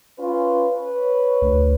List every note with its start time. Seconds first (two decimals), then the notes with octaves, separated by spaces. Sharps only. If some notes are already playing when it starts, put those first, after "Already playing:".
0.18 C#4 F4 B4
0.72 B4 C#5
1.42 D2